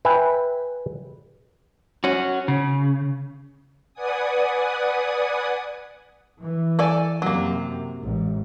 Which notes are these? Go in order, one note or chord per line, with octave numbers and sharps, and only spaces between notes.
B4 E5 G5 G#5
C#4 F#4
C#3
B4 D5 F#5 G#5 D#6
E3
A4 D5 G#5
F#2 C3 F#3 A#3
A1 G#2